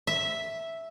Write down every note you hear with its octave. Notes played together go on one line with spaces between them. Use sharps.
E5